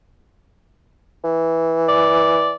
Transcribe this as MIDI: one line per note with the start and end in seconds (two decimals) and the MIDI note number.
1.24 2.54 52
1.88 2.54 74